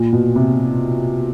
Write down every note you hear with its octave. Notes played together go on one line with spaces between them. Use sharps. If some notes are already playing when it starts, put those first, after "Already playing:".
Already playing: A#2
B2
C3